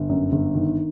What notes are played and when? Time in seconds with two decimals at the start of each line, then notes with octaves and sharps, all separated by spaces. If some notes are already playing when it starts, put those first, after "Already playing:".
Already playing: G1
0.09 F#2
0.32 G1
0.55 D#3